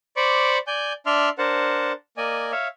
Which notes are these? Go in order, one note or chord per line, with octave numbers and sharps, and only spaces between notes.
C5 D5 B5 C#6 D6
D5 G#5 G6
D4 D5 E5 C6 F6
D4 A#4 C5 F#5 A5
A#3 D5 D#5 G#5
C#5 E5 F5